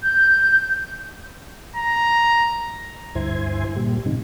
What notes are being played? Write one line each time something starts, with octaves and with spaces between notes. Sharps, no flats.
G6
A#5
D2 G2 E4 C5 G#5
A#2 G3
G#2 C3 D#3